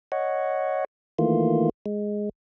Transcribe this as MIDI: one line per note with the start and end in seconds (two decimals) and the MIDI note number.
0.12 0.85 73
0.12 0.85 75
0.12 0.85 78
1.19 1.69 51
1.19 1.69 52
1.19 1.69 57
1.19 1.69 58
1.19 1.69 65
1.86 2.29 56